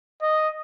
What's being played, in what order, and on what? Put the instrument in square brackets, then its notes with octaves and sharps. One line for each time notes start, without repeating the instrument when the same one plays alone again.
[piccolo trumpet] D#5